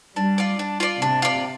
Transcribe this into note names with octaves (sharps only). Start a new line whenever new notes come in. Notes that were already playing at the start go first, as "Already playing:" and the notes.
G3 D4
F4 D5
D4
F4 D5
C3 D4
F4 D5